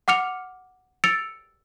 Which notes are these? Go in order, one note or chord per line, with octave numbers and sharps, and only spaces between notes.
F#5 D6 F6 C#7 F7
E6 A6 C#7 D7 F7